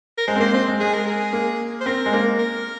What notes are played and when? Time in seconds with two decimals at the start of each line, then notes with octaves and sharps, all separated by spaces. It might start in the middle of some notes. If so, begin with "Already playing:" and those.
0.18 A#4
0.27 G#3 C5
0.36 C4
0.40 A#3 C5
0.54 C4 C5
0.68 G#3
0.80 G#3 G#4
0.94 A#4
1.07 G#4
1.33 A#3
1.81 C5
1.86 C4 A#4
2.06 G#3
2.13 A#3
2.39 A#4